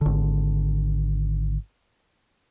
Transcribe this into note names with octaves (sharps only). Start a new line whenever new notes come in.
G#1 D3